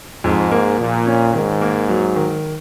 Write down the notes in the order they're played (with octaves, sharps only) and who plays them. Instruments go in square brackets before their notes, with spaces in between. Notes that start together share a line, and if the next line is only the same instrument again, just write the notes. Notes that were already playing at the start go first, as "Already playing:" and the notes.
[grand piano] F2 [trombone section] G#2
[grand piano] A#3
[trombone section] A#2 [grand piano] F3
[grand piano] C#4
[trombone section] G#2 [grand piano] D#3
[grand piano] A#3
F#3
D#3